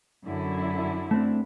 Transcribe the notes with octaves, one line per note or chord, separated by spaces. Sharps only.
F#2 D3 E4
A3 C4 D4